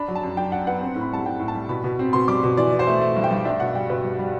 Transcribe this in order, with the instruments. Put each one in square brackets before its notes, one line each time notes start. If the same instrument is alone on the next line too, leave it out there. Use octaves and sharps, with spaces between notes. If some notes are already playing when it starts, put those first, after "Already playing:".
Already playing: [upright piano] D4 B5
F#3
A5
F#2
D4 G5
D4 F#5
B3 F#5
C4
A2
B5
G3 A5
A2 G5
A2
A5
G3
B2 B5
B2
C4
B2 C6
G3 D6
B2
E3 D5
E3
C5
A3
A3
G2
G5
G2
D4 E5
B2 F#5
G3 G5
B2 B4
G3
G3